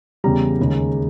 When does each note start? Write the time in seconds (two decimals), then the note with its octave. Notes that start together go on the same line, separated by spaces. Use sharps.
0.24 E2 C#3 G3 A#5
0.59 D#2 C#3 G#3